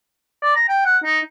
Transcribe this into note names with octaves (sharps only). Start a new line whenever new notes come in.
D5
A#5
G5
F#5
D#4